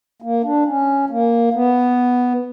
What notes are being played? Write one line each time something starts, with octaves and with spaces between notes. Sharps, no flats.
A#3
D4
C#4
A#3
B3